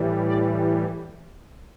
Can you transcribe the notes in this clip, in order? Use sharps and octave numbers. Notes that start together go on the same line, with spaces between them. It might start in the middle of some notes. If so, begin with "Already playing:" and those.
Already playing: A2 E3 G3
D5